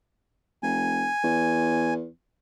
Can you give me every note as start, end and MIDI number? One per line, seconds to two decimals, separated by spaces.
0.63 1.08 29
0.63 1.94 80
1.23 2.08 40